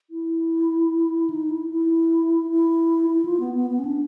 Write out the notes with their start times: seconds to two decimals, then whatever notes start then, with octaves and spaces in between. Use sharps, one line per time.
0.10 E4
1.30 D#4
1.50 E4
1.70 E4
2.50 E4
3.10 E4
3.25 F4
3.40 B3
3.55 B3
3.70 B3
3.79 C#4
3.85 D4